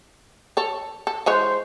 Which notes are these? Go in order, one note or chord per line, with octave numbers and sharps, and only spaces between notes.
A4 C#5
A4
E3 G#3 C5 C#5